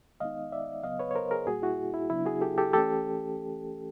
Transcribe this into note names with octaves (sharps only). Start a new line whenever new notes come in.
D#3 G#3 B3 D#4 D#5 F5
D5 E5
C#3 F#3 B3 D#5 F5
B4 C#5
C#5
A#4 C5
G#4 A#4
A#2 G3 A#3 F#4 G#4
E4 F#4
E4
C#3 F#3 B3 D4 E4
F#4 G#4
G4 A4
G4 A4
E3 A3 C#4 G4 A4